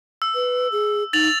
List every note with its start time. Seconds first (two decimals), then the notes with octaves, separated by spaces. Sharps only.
0.22 E6
0.35 B4
0.72 G#4
1.13 D#4 A6 F7 F#7